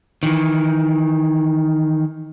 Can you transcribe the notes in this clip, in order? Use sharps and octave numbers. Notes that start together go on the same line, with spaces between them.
D#3 E3